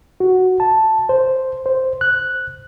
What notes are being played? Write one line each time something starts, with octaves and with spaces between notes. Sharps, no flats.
F#4
A5
C5
C5
F#6